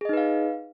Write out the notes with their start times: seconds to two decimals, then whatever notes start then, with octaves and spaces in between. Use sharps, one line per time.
0.01 G#4
0.05 D#5
0.09 D#4
0.13 B4
0.17 F5